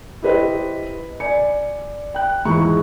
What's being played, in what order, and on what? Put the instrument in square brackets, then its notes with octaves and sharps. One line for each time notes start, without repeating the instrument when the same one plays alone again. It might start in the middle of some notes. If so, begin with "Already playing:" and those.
[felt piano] E4 G4 B4 C5 D#5
D5 G#5 C#7
G5 F#6
E2 G#2 F3 E4 A#5 C#6